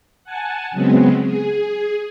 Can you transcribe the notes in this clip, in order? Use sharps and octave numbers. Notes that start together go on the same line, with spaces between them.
F#5 G#5 A5
C#3 F#3 G#3 B3 C4
G#4